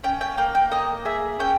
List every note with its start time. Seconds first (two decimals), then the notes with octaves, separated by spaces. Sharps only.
0.04 C#4 G5
0.21 G5
0.38 A#3 G5
0.55 G5
0.71 A#3 D#5
1.05 G#4 E5
1.39 C#4 G5